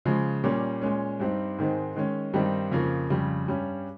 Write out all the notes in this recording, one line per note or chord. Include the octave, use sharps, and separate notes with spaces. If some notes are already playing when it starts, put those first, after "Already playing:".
C#3 F3 G#3
A#2 G3 A#3 C#4
A#2 G#3 C#4
G2 G3 C4 D#4
G#2 D#3 G#3 C4
D#3 G#3 C#4
G2 D#3 G3 C4 D#4
F2 C#3 F3 A#3
F2 C#3 G3
G2 G3 C#4